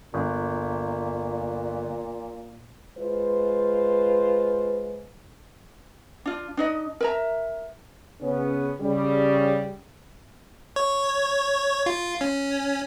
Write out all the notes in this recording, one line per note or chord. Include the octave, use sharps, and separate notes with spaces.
G1 A#2
G#3 F4 B4 C5
D4 F4
D4 D#4 D#5
A#4 E5 A#5
C#3 B3 C#4
C#3 G3
C#5
F4
C#4